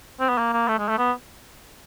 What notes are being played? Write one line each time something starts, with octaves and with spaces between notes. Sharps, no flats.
C4
B3
A#3
A#3
A3
G#3
A3
B3